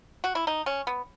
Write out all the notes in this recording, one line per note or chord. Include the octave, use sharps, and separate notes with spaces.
F#4
E4
D#4
C#4
B3